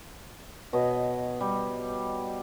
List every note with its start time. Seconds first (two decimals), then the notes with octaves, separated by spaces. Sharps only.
0.73 B2 C#5 D#5
1.40 G3